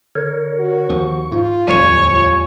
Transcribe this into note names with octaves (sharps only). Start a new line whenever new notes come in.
D3 A#4 C#5
F#4
D#2 F3 C#6
G#2 F4
D1 A#1 E2 F3 G3 C#5 G#5
F4